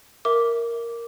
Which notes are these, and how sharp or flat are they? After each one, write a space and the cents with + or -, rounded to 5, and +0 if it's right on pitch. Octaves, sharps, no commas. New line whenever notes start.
A#4 +0 E5 -5 D6 -10